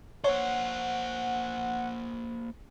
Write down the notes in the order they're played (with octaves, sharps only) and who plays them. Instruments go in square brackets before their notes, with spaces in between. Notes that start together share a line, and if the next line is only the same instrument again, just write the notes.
[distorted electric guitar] A#3 C5 [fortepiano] C#5 [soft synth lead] F#5